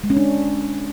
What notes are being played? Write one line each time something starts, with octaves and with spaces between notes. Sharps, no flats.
G#3
C#4
D4